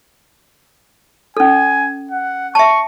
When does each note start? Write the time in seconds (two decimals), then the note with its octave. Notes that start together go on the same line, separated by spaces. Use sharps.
1.37 C#4 A4 G#5
2.11 F#5
2.55 E5 A5 C#6